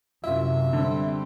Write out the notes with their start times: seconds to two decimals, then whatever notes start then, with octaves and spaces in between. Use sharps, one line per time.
0.24 F#2 C3 E4 F4 E5
0.73 D3 G3 C4